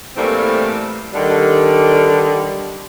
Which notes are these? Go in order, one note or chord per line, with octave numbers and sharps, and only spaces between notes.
A2 E3 G3 A3 A#3 C4
D3 D#3 G3